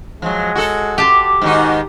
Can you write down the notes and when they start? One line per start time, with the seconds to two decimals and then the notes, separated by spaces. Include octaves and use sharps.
0.22 F3 F#3 G#3
0.55 F#4 A4
0.98 G4 A5 C6 D6
1.42 G#2 D#3 D#4 F#4